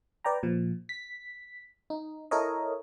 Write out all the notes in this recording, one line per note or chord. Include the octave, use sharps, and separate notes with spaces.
B4 D5 G5 A#5
A#2 F3
B6
D#4
E4 A4 A#4 C#5 D#5